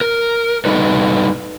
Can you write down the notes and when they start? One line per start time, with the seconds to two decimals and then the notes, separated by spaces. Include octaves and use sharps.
0.01 A#4
0.65 G3 D#4 A4 B4